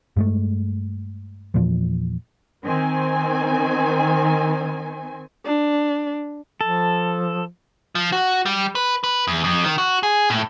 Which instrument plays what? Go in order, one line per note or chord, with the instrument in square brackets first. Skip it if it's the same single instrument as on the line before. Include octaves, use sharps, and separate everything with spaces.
[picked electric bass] G2 G#3 A3
E2 A#2 F3
[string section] D#3 C4 G#5
[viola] D4
[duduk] F3 [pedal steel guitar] A4
[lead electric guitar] F3
F#4
G3
B4
B4
E2
F2
D#3
F#4
G#4
A2